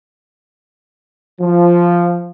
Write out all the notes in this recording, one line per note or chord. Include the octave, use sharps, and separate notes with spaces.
F3